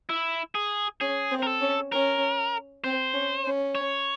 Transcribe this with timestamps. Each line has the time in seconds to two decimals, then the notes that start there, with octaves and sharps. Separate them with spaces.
0.09 E4
0.55 G#4
1.01 C#4 G#4
1.31 C4
1.43 A#4
1.47 A4
1.61 C#4
1.92 C#4 A#4
2.84 C4 C5
3.14 C#4
3.45 C#4
3.75 C#5